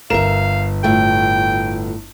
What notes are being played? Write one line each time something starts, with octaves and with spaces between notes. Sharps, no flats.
G1 A#4 E5 F5 E7
A2 F4 E5 G5